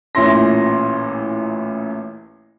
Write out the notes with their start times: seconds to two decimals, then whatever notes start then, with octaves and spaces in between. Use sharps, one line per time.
0.15 A1 A#2 C#4 E4 C6 A#6